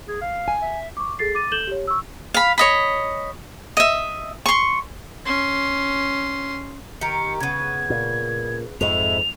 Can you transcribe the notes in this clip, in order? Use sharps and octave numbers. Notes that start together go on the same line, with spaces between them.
G#4
F5
G#5
E5
C#6 D6
G#4 A4 A6 C7
D6 A6 D#7
A4 G6 E7 F#7 G7
G4 C#5
C#6 E6
F5 B5
C#5 D#5 B5
D#5 E5
C6 C#6
C#4 C6
D#3 G4 A#4 C#7
C#3 B3 G#6
A#2
F2 G#2 G#3 A3 E4 F7